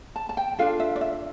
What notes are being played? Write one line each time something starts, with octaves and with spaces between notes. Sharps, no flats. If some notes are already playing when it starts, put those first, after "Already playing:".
A5
A5
G5
D4 F4 A4 F5
E5
D5
E5